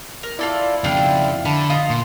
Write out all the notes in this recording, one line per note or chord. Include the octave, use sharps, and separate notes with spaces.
A#4
E4 F4 A4 D5
F2 C#3 D4 F4 G5
D3 A5 B5
D#4 F4 D#6
A#2 C6